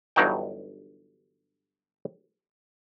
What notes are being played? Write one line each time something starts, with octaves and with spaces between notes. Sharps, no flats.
G1 G2 E3 F#3 D#4 G5